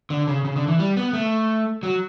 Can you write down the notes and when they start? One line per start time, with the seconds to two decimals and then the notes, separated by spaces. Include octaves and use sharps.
0.10 D3
0.27 C#3
0.45 C#3
0.56 D3
0.68 E3
0.79 G3
0.97 B3
1.13 A3
1.83 F#3